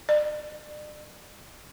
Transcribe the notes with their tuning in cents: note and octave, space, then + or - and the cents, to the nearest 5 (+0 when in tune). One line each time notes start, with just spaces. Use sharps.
D5 +35